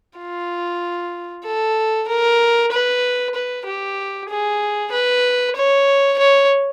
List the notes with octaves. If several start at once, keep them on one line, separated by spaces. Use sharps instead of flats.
F4
A4
A#4
B4
B4
G4
G#4
B4
C#5
C#5